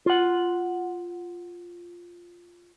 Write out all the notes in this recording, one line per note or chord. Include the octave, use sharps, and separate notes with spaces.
F4 F#5